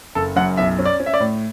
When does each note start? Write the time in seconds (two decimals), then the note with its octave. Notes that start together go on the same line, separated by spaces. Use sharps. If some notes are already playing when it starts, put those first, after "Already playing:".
0.15 F#1 A4
0.36 F#2 F#5
0.57 B1 E5
0.79 C#4
0.86 D5
1.00 C#4
1.06 E5
1.14 D5
1.20 A2